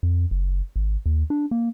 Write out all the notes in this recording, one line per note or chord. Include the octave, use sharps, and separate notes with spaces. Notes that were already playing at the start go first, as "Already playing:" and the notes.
F2
F#1
G#1
D#2
D4
A#3